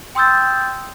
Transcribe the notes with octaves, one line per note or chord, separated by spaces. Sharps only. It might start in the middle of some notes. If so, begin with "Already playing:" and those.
G5 C6 D#6 E6 G6 A6